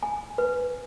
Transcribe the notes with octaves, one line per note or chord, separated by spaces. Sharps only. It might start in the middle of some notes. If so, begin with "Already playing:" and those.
G#5
B4